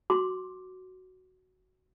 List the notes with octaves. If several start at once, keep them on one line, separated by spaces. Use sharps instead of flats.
F#4 C6 D6